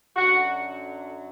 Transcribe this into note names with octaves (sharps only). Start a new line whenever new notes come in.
F#2 D3 F#3 F#4